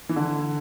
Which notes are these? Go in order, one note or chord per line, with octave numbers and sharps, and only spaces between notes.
E3
D3